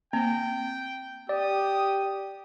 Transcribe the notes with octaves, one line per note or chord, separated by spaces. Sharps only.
A#3 C4 G5
G4 D5 D#6